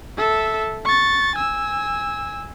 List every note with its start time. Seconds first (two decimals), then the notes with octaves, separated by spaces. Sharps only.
0.18 A4 E5
0.84 C#6 A6
1.36 G#5 E6